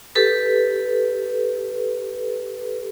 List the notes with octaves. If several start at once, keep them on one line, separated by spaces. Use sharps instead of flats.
G4 A4 B4